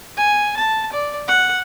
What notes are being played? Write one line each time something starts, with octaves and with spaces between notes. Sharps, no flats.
G#5
A5
D5
F#5